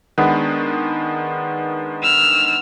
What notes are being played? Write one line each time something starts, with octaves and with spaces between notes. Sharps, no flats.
D#3 G#3 B3 D4
E6 F6